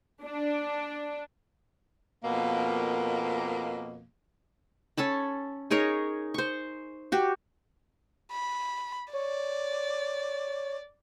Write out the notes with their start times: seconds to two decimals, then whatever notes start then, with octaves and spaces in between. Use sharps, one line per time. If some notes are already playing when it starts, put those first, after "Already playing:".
0.23 D4
2.24 F2 B2 A#3
4.97 C#4 A4 A5 B5
5.71 D#4 G#4 A#4 C#5
6.34 C5 C#6
7.12 F#4 G4
8.32 B5
9.13 C#5 D5